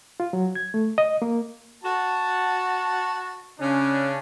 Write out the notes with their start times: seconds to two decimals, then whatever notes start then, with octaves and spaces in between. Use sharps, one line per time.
0.20 F4
0.33 F#3
0.55 G#6
0.74 A3
0.98 D#5
1.22 A#3
1.84 F#4 A5
3.59 C#3 C#4 D4